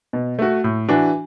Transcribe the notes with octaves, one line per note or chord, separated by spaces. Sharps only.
B2
A3 F#4
A2
E3 D4 F#4